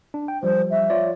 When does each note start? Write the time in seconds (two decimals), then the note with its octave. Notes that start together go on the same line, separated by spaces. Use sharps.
0.14 D4
0.28 G5
0.43 F3 G3 C5
0.71 E5
0.90 F4 C#5 D5